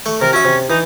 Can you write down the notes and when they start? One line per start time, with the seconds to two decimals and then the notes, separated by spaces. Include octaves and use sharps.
0.06 A3 C#6
0.21 C3 A#4
0.33 C#4 F#4 E5
0.45 C3
0.70 E3 D#4